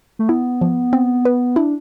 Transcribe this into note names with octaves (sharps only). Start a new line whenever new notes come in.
A3
B3 E4
F3
C4
B4
D4 E4